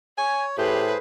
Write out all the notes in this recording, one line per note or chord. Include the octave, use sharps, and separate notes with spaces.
C#5 G#5
A2 G4 G#4 B4 C5